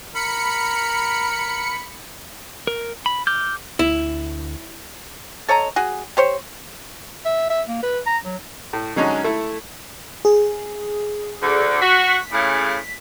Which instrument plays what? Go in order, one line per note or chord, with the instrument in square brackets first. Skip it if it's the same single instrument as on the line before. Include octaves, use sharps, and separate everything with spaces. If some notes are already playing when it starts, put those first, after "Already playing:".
[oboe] A#4 [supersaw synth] B5 C#7
[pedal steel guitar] A#4
B5
D6 F6 G6
[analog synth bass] D2 [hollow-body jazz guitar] E4
[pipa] A4 C#5 D#5 A#5
F#4 G#4
G4 C5 C#5
[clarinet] E5
E5
A#3
B4
A#5
F#3
[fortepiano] A2
D3 F#3 G#3 C#4 D#4
A3 E4
[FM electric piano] G#4
[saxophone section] D2 D3
[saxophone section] F#4 [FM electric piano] B6
[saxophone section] A2 C#3